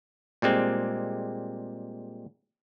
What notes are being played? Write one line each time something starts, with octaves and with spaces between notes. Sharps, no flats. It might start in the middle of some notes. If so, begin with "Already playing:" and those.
A#2 G3 G#3 C4